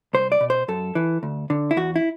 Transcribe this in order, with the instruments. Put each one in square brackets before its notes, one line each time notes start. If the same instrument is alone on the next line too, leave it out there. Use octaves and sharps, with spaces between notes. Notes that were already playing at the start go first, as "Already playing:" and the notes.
[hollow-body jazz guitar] C2 C5
D5
B2
C5
F#2 A4
E3
D2
D3
E4
E2 F#4
E4